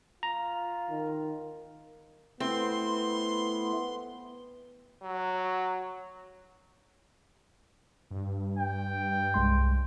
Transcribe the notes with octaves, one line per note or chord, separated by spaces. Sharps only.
F4 A#5
D#3
A3 B3 C4 E4 C6
F#3
G2
G5
C2 G#3 C6